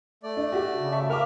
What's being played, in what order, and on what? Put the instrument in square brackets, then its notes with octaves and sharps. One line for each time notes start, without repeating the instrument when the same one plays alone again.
[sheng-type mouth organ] A3 D5
[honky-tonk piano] D4
F#4 G4
[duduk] C#3
[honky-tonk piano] E5 A5 C#6
[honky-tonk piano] A#4 F5 D6 [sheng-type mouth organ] E5 F6